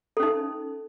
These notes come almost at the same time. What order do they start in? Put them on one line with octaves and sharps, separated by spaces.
A4 C#4 D#4